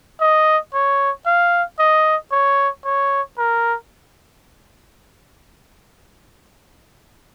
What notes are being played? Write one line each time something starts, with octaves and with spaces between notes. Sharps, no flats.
D#5
C#5
F5
D#5
C#5
C#5
A#4